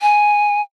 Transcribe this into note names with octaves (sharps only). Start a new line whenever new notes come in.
G#5